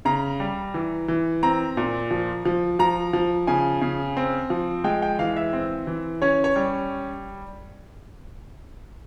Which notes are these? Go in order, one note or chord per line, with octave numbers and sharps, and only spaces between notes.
C#3 A#5
G3
E3
E3
C4 A#5
A#2
F3
F3
F3 A#5
F3
C#3 G#5
C#3
C4
F3
G#3 G5
G5
E3 F5
E5
C4
E3
C#4 C#5
C#5
G3